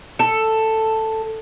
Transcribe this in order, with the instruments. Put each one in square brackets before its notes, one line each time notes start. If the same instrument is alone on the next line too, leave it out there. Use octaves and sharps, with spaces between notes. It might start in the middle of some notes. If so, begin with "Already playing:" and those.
[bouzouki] A4